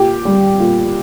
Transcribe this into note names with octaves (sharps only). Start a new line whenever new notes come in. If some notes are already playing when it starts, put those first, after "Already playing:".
Already playing: A#2 G4
G3
A#2